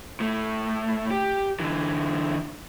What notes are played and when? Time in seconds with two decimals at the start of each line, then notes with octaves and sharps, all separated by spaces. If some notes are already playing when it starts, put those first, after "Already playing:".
0.20 A2 A3
1.11 G4
1.60 D3 E3